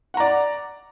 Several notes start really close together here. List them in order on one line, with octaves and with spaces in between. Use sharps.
F#5 A#5 D5